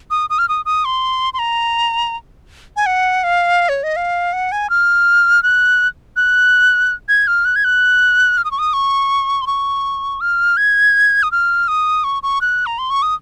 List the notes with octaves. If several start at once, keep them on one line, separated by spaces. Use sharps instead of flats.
D#6
D#6
F6
D#6
D#6
C6
C6
A#5
G#5
F#5
F5
C#5
D#5
F5
F#5
G#5
F6
F#6
F#6
G#6
F6
F#6
G#6
F#6
F6
D#6
C#6
D#6
C#6
C6
C#6
F6
G#6
D#6
F6
D#6
C#6
C#6
F#6
A#5
C6
C#6
D#6